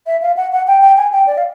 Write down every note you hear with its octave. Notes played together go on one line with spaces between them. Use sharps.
E5
F5
F#5
F#5
G5
G5
G#5
G5
D5
F5